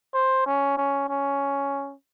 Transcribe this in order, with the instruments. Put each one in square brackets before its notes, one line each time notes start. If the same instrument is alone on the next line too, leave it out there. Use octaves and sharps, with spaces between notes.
[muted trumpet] C5
C#4
C#4
C#4